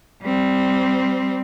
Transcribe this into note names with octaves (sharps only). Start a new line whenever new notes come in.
G3 C4